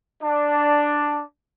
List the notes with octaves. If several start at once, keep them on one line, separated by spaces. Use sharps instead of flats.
D4